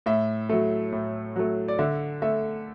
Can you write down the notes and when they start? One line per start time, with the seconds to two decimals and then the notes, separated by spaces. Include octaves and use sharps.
0.06 A2 E5
0.49 F#3 A3
0.92 A2
1.36 F#3 A3
1.68 D5
1.79 D3 E5
2.22 A3 E5